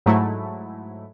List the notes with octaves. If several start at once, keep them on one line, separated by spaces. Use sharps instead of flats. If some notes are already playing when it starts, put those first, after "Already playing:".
G#2 F#3 A3 E4